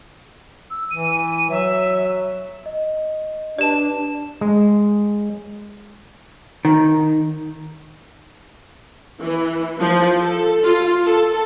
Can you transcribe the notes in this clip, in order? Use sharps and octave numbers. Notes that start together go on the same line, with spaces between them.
E6
E3 D#7
F#3 E5
D#5
D4 G4 B4 D5 A5 E7
G#3
D#3
E3
F3
A4
F4
A4